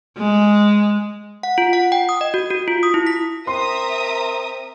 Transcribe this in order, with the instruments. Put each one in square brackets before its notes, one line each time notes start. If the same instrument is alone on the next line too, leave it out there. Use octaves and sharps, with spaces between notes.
[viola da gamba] G#3
[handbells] F#5
F4
F#5
G5
D#6
D#5
F#4
F#4
F4
D#6
E4
B6
[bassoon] C4 [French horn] A#4 [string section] E5 A#5 D#6 [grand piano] C6